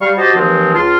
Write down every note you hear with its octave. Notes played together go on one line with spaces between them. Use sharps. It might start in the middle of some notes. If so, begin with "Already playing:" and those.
G3 F5 C#6
F#4 G4 C5 D#5 A5
D#2 E3 F3 G#3 C4
C#2 F4 A5 C6 F6